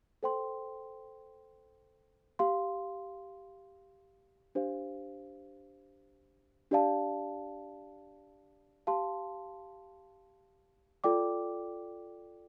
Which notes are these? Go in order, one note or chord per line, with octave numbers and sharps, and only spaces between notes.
A4 C5 G5 C6
G4 F5 C6
D4 G4 C5 F5
D4 G4 D5 F5 A5
G4 F5 A5 C6
F4 A4 D5 G5 D6